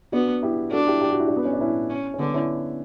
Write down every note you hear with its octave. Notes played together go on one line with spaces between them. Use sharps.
B3 D4 F#4
E4 G4
D4 F#4 A4
E4 G4
G4
F#4
E4
D4 F#4
B3
C#4
D4
C#4 E4
C#4
C#4
D3 B3 D4
C#4 E4